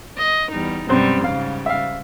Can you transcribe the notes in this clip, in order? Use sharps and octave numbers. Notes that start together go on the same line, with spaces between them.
D#5
E2 G3 D#4
F#2 B2 G3 G#3 C4
G#2 C#3 G3 F5
E5 F5